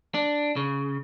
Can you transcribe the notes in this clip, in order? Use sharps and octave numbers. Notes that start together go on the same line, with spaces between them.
D4
C#3